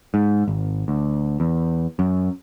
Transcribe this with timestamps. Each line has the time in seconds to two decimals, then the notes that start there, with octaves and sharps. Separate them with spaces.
0.14 G#2
0.48 G#1
0.88 D2
1.40 E2
1.99 F#2